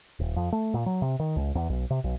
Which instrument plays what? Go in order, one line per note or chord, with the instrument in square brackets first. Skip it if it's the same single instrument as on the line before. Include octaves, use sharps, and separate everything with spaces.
[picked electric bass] D#1
F2
A3
A#2
F#3
C3
D#3
C#2
E2
B1
C3
B1